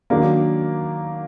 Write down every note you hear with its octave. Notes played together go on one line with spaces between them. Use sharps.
D#3 F#3 A#3 D4